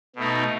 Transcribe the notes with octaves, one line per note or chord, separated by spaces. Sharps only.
B2 A3 D#4